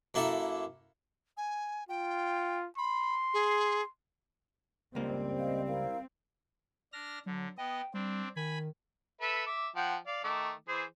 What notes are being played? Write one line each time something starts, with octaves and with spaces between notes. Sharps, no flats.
F#2 A#3 E4 A4
G#5
F4 G5
B5 C6
G#4
C#2 G3 A#3 C4
D#5 F5
E4 A#4 F5
D4 F6 A#6
D3 F#3
B3 D#5 G5
G3 C4 D4
D#3 G#5 B5
A4 B4 E5
E5 D6
F3 F#5 G5
D5 F5
D#3 A3 D6
E3 G#4 C5